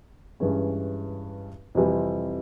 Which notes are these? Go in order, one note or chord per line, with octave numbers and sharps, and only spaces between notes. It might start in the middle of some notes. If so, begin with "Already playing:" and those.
G2 E3 G#3 C#4
F2 C3 E3 G3